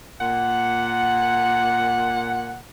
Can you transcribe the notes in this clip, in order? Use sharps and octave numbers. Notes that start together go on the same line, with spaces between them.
A#2 F#5